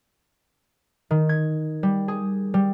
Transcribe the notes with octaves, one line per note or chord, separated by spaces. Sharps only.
D#3
G#6
G3
G#4
G3